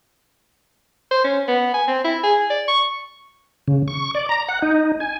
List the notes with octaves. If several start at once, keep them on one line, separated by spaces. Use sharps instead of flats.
C5
C#4
B3
G#5
C4
E4
G#4
D5
C#6
C#3
C#6
D5
A#5
F#5
D#4
G#5